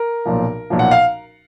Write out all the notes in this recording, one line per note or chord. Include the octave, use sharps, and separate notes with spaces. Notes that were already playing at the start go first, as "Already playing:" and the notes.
Already playing: A#4
B1 A#2 F3
B1 A#2 F3
F#5
F5